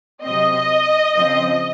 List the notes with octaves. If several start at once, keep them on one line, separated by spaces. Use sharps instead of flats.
C3 F#3 C4 D#5
C#3 F3 C4